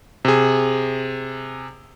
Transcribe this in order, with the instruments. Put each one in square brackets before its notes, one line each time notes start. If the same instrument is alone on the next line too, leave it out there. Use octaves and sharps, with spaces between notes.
[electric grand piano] C3 G#4